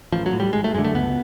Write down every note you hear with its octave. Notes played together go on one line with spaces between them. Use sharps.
A1 F3
F#3
A2
G3
G#1 G#3
A3
F#2 D3 G#3
A3
C#2 B3